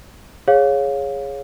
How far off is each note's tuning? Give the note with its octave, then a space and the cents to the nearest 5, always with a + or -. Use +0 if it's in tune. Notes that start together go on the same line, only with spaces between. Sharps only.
G#4 +0 C#5 -5 F5 +20